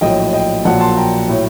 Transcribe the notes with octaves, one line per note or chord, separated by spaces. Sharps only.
A#1 A2 F#3 D#5 G5
D#5 G5
A#1 A#2 F#3 F#5 A5
A5 C6
G5 A#5
A2 F#3